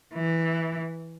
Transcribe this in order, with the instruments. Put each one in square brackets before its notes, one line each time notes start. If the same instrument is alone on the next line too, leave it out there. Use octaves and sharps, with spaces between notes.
[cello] E3